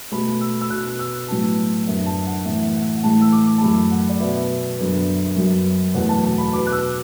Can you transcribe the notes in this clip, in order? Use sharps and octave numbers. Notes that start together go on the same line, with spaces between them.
B2 A3 B5
E6
E6
B2 B3 F#6
E6
A2 F#3 B3 A5
F#2 D3 B3 E5
A5
F#5
A2 E3 B3 E5
F#5
F#5
A2 E3 A3 A5
E6
D6
A5
F#2 F#3 A3 B5
F#5
D5
B2 B3 E5
F#2 D3 B3
F#2 F#3 B3
E2 B2 F#3 A3 F#5
A5
A5
B5
B2 B3 D6
F#6
E6